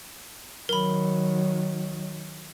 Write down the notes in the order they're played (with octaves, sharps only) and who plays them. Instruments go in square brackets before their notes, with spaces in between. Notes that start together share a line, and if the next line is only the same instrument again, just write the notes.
[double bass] D#3 F#3 [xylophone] A#4 B5